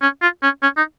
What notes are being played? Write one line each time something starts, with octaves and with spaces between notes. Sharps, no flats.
C#4
F4
C#4
C#4
D#4